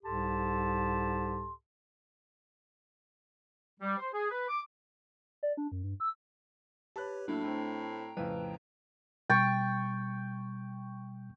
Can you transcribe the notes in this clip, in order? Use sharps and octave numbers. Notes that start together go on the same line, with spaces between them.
C2 G#2 G4 A4 A5 C6
G3
C5
G#4
B4
D6
D5
D4
F#2
G2
E6
G4 B4 C#5 A5 B5 F#6
A2 F#3 A#3 D4 E4
A3 C4 G5 A#5
F2 A2 C#3 B4
B2 G3 G5 C#6 A6